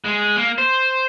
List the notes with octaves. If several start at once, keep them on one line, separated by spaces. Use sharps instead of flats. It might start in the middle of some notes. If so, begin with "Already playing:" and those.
G#3
A#3
C5